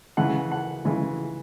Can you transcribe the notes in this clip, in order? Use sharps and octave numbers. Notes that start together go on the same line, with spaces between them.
C#3 E3 G#3 F#5
F#5
C#3 E3 G#3